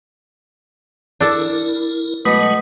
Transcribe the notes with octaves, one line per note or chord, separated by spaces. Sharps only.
D4 E4 A4 A#4 A5
B2 F#3 G#3 A3 D#6 B6